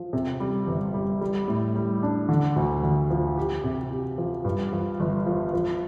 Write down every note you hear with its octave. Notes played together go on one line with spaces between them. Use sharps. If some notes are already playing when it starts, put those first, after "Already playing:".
Already playing: F3
C3
G3
G1
G3
G3
A2
G3
D4
D3
D2
D2
F3
G4
C3
G4
F3
G2
F3
G1
F3
F3